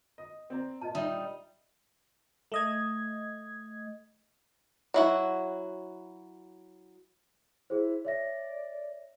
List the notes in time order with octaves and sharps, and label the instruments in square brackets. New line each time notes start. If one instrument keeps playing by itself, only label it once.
[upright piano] D#5
C4 D5 A#5
[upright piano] A#2 [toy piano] D#5 A5
[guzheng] G3 D#4 [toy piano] E5
[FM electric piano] A3 D#5 G#6
[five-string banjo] F#3 E4 F#4
[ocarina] E4 [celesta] G#4 C5
[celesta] C#5 E5 A#6 [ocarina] D5